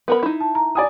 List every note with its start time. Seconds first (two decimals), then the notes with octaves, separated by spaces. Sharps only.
0.08 B3 A#4 B5
0.23 D#4 E4
0.41 A5
0.55 A#5
0.75 D5 G#5 D#6